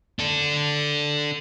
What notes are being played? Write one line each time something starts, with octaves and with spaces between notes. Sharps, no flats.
D4 A4